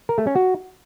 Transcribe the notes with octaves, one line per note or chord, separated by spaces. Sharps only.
A#4
A3
C#4
F#4